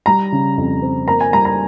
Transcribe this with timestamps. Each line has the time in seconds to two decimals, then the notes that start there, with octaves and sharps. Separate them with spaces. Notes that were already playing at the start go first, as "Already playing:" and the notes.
0.06 G3 A#5
0.32 C#3
0.58 F2
0.82 C4
1.07 A#3 A#5
1.21 G#5
1.33 G3 A#5
1.45 A#5